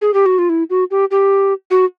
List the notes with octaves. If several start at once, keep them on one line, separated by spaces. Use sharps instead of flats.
G#4
G4
F#4
F4
E4
F#4
G4
G4
F#4